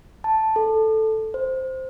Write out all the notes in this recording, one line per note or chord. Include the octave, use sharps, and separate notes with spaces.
A5
A4
C5